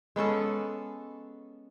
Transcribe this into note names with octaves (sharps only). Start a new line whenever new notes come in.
G#3 B3 C#4 A4